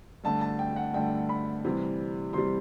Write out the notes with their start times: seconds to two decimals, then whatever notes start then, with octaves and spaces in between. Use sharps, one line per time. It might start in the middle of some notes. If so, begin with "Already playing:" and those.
0.24 G2 D3 A3 A5
0.41 A5
0.59 G5
0.76 F#5
0.93 G2 D3 A3 G5
1.29 B5
1.65 C3 E3 G3
2.33 C3 E3 G3 C6